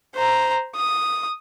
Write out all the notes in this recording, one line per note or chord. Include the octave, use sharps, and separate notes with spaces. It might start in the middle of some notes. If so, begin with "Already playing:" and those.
C5 A#5
D#6